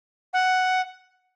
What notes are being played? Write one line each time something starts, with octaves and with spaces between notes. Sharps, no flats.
F#5